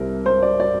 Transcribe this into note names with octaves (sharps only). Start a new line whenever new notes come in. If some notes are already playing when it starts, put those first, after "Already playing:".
Already playing: C2 C3 G3 A#4
C5
D5
D5